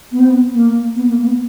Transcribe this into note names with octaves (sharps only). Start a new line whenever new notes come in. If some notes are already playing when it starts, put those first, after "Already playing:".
B3
C4
B3
A#3
B3
A#3
B3